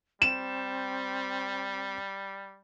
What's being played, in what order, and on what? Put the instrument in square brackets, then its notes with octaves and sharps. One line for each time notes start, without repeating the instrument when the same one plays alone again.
[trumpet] G3 [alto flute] C4 [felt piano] E7